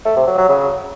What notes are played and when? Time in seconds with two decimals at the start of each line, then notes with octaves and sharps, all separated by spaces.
0.05 A3
0.16 C3
0.27 F#3
0.38 F#3
0.49 C#3